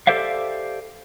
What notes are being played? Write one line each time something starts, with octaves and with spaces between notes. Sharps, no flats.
G4 A4 C5 D5 E5 F5